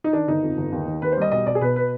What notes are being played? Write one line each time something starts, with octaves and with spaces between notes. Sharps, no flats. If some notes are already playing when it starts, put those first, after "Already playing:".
D#4
D#3 D4
G1 D#4
F2
G1
D#2
D#3
D#2 B4
C5
G3 D#5
B1 D#5
B1 D5
G#4
B2 B4
B4